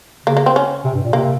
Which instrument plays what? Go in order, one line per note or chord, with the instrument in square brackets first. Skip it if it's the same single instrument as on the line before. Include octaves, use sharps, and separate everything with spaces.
[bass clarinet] C#3 [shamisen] A#3
[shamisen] A#3
C4
C#4
[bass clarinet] C3
G2
A#2
[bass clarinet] C3 [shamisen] A#3